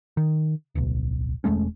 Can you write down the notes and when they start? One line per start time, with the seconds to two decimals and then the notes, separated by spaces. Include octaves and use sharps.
0.17 D#3
0.75 D1 B1
1.44 E1 G#3 A3 C#4